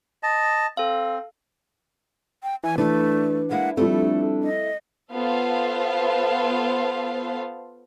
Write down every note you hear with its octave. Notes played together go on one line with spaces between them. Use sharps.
D#5 A5
C4 A4 F5
G5
E3 G#5
E3 A3 D4 B4
G#3 A#3 E4 F#5
F3 G3 A3 C4 E4 A4
D#5
B3 F4 A4 C5 F5